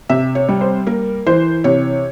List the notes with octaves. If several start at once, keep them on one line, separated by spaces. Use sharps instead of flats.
C3 E5
C#5
G3
C5
A#3 A#4
E3 C5
C3 C#5